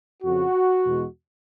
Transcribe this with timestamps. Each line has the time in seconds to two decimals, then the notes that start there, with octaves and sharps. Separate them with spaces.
0.23 F2 C#3 F3 F#4
0.83 E2 B2 G#3